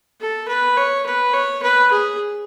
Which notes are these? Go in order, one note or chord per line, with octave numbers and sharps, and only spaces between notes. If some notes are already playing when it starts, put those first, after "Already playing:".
A4
B4
C#5
B4
C#5
B4
G#4